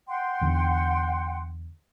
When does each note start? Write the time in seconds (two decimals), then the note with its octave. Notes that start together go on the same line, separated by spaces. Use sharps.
0.08 F#5 G5 C6
0.41 E2 D3